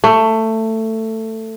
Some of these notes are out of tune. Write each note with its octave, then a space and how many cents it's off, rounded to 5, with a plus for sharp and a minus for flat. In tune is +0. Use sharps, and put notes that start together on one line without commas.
A3 +15